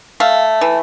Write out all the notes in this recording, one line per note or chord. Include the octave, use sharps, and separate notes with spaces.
A3 F5
E3